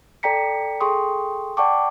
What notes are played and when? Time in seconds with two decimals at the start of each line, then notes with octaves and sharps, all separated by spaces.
0.23 A4 D5 G5 A#5 B6 C#7
0.81 G#4 A4 G5 C6 C#6 D#6
1.57 D5 F#5 G5 A5 C#6 D6